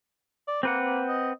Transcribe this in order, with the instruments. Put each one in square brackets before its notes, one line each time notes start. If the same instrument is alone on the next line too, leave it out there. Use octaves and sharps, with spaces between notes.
[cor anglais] D5
[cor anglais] A#3 [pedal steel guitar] C4 B4 F#5
[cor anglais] A#3
D#5